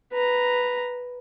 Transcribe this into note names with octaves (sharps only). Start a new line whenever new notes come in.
B4 A#5